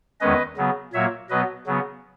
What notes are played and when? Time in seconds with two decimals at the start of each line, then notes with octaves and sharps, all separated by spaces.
0.20 E2 D#3 G#3 C#4 B4 D#5
0.57 C#3 F#3 B3
0.94 A#2 F#3 A#3 C#5 E5
1.30 B2 F#3 B3 B4 D#5
1.67 C#3 F#3 B3